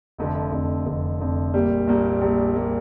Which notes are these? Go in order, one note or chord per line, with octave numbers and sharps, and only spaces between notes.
F1 F2 D3
F1 F2 D3
F1 F2 D3
F1 F2 D3
A#1 A#2 G3 A#3
A#1 A#2 G3 A#3
A#1 A#2 G3 A#3
A#2 G3 A#3